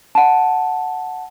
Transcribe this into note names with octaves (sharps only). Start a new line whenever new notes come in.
F#5 A5